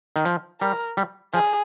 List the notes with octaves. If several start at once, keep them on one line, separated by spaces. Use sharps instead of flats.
D#3
F3
G3 A#4
G3
F3 G#4